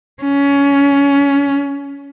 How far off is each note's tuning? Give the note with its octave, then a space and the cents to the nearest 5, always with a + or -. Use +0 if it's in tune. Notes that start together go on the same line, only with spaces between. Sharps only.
C#4 +20